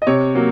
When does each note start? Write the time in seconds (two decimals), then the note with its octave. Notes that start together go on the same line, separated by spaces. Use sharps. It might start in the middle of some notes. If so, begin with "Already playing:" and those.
0.02 D#5
0.07 C3 C#5
0.35 F#3 A#3